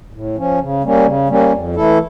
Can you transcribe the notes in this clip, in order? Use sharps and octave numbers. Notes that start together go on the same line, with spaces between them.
A2
F3 C#4
C#3
G3 A#3 C#4
C#3
G3 A#3 C#4
F2
E3 A3 E4 A4